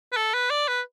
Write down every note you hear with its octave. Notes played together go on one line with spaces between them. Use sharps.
B4
A4
B4
D5
B4